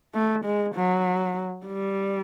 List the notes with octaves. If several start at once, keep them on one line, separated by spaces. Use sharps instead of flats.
A3
G#3
F#3
G3